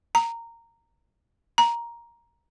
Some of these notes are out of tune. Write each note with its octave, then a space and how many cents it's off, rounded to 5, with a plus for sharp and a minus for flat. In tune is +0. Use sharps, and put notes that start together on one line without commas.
A#5 -15
A#5 +5